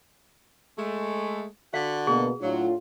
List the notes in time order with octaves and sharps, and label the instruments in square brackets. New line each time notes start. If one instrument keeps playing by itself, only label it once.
[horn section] G#3 A3
[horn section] D3 F#4 [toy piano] F5
[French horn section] B2 A#3 B3 [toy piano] G#4
[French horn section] A2 D4 F4 [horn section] F#3